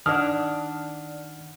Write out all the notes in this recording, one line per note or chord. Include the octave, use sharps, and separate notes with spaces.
D#3 D4 D5 F#5 D#6 F6